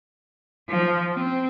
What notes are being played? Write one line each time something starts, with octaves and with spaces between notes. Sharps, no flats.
F3
C4